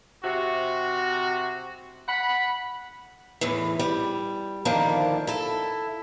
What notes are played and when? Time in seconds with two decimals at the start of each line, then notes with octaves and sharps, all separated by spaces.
0.23 C3 F#4
2.08 F#5 B5
3.41 E2 A2 E3
3.79 G3
4.65 D3 D#3 F3 A#3 D4 E4
5.27 E4 A4